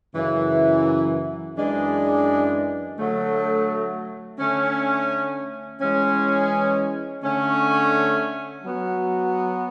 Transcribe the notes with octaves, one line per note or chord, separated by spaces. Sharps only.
F#2 C#3 E3
F#2 E3 G#3 D4 G#4
D3 F#3 A3
D3 A3 C#4
E3 G#3 C#4
D3 A3 C#4
F#3 B3 F#4